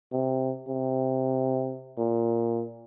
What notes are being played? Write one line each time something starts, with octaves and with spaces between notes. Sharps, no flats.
C3
C3
A#2